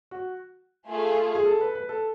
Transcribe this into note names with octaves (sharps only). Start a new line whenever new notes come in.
F#4
A3 F4 G#4
G#4
A4
B4
B4
A4